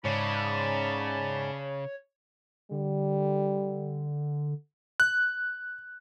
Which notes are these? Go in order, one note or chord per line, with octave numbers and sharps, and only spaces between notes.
G#2 C#3 C#5 D5 A5 B5
D3 G3
F#6